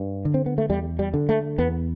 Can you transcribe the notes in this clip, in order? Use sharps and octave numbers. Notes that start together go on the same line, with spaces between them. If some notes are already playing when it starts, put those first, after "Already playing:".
Already playing: G2
D3
C4
B3
A3
E2 G3
G3
D3
A3
E2 B3